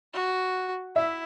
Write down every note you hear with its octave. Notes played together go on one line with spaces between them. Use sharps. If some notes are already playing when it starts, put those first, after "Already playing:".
F#4
E4 E5